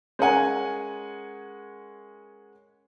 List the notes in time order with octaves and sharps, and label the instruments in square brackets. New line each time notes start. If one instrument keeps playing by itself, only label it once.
[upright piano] G#3 C#4 A#4 F#5 G#5